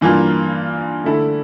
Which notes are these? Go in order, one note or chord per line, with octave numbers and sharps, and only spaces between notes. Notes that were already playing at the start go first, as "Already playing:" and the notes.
G2 E3 A#3 F4
D3 A3 E4 A4